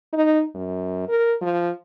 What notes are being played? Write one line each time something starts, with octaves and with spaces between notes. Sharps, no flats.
D#4
F#2
A#4
F3